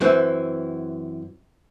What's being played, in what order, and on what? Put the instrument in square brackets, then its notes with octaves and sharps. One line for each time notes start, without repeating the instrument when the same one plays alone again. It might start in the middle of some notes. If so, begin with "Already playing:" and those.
[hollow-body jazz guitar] F#2 E3 C4